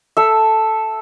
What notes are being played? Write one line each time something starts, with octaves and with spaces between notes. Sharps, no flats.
A4 E5